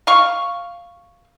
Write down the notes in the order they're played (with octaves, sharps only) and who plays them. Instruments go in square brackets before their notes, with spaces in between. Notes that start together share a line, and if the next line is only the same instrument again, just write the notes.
[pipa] F5 C#6